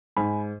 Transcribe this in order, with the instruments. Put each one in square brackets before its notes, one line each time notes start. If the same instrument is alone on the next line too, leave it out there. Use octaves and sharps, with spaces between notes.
[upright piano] G#2 G#5 B5